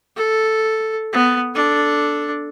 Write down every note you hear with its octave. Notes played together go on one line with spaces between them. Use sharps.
A4
B3
D4 A4